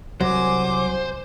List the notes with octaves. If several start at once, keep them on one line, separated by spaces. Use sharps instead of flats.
C2 F#3 C5 G#5 D6